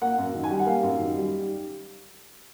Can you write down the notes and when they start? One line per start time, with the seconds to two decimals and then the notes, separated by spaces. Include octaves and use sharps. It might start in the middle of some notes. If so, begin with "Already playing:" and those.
0.02 A#3 F#5
0.18 F#2
0.34 D#3
0.44 G#5
0.50 G3 G5
0.59 F#5
0.66 A#3 F5
0.83 F#2
0.99 D#3
1.16 G3